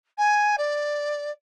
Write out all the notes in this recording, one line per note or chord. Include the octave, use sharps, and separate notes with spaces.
G#5
D5